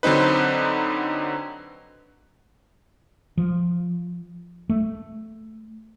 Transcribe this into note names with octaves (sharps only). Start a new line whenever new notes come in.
D3 F#3 C4 D#4 B4
F3
A3